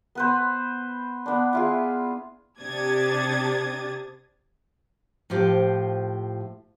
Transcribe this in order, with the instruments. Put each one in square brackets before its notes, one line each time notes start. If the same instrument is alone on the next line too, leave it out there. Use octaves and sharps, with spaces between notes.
[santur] B3 B4 C5
B3 D4
E4 F4 G#4
[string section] C3 D4 G4 D#6 G#6 A6
[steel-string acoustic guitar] A2 F3 F4 G4 C5